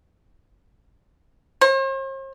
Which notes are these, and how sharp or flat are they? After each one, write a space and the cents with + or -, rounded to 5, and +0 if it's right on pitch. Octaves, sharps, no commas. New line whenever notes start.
C5 +45